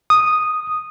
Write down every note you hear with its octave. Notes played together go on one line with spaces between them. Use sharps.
D#6